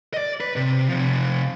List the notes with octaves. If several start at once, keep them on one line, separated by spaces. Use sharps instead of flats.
D5 D#5
B4
C3
C3 F3